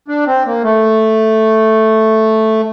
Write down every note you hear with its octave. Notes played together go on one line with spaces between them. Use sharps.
D4
C4
A#3
A3